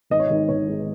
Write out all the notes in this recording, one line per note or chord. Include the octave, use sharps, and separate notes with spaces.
G#1 D#5
C#5
G#1 D#5
G#1 C#5
G#2